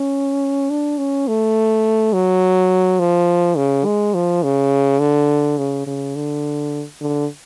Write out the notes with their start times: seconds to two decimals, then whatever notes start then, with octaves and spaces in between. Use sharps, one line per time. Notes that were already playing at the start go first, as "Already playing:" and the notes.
Already playing: C#4
0.70 D4
0.98 C#4
1.28 A3
2.13 F#3
2.99 F3
3.57 C#3
3.85 G#3
4.14 F3
4.43 C#3
5.00 D3
5.58 C#3
5.87 C#3
6.15 D3
7.01 D3